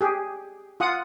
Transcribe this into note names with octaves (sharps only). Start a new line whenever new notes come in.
G4 G#4
F4 F#5 D#6